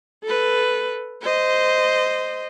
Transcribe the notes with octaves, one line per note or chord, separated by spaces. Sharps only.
A4 B4
C5 D#5